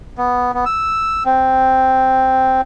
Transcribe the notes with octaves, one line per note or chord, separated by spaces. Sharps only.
B3
B3
E6
C4